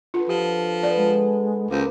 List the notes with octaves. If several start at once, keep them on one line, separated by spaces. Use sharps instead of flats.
D3 F4 B4
F3 G4
B3 B4 D5
G#3 A4
C#2 A#3 B4 C5